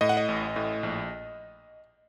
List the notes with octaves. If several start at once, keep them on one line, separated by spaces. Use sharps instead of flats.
A2 D#5
F#5
D#5
A1
A2
A#1